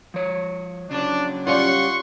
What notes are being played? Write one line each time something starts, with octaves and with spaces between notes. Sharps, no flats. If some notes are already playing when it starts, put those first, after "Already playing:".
F3 C#5
C#3 F#3 D4
G3 C#4 F4 F#5 C6 C#6